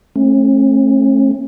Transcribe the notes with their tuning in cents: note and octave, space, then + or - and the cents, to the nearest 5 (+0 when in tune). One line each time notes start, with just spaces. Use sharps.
A3 -5 C#4 -45